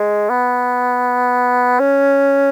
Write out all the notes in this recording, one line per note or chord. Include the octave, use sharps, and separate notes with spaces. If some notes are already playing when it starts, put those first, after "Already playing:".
Already playing: G#3
B3
C#4